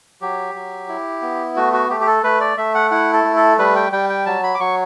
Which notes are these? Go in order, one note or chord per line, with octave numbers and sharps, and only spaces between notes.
F#3 G4
F#3
E4
B3
A3 F#4
F#4
A3 G4
G4
A4
A3 B4
D5
A3 E5
F#5
E4 F#5
A4
A3
A4
G3 B4
G5
G3 G5
G5
F#3 A5
B5
D6
F#3 C#6